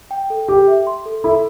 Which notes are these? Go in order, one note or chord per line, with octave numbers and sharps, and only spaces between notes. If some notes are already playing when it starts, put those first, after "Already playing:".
G5
A4
G4 D6
E5
C6
A4
E4 A4